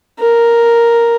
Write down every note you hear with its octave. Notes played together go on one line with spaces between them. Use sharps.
A#4